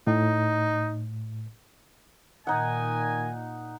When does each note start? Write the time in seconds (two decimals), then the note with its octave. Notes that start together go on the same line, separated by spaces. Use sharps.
0.07 A2 D#4
2.47 A#2 D#3 D#4 D#5 F#5 G#5